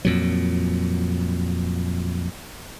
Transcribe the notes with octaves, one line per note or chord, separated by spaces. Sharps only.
F2 A#2 F#3